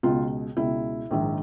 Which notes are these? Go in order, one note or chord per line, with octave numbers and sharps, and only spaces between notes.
C#2 B2 F4
C#2 B2 E4
A#1 G#2 D#3